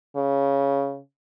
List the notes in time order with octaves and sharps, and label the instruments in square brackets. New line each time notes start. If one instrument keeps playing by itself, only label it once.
[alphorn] C#3